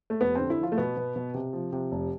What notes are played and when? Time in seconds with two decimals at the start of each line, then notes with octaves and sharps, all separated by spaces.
0.10 A3
0.21 F1 B3
0.35 D3 C4
0.50 E4
0.59 F3 F4
0.72 A3
0.78 B2 B3
0.97 B2
1.16 B2
1.34 C3
1.53 F3
1.72 C3
1.92 F1